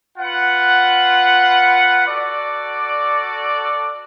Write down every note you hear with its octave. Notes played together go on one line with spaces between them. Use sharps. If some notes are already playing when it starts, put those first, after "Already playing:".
F4 B4 F#5
F#4 A4 D5